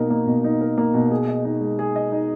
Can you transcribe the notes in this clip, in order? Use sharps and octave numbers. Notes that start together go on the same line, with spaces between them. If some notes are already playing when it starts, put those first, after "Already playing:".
Already playing: B2 A#3 D#4 A#4
A#3
B2
D#4
A#4
A#3
B2
G#4
D#5
D#4
G#3
G#4
D#5
D#4